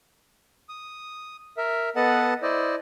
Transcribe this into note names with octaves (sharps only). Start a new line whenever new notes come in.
D#6
A#4 E5
B3 A4 B4 D#5 F#5 A5
E4 C5 D5 D#5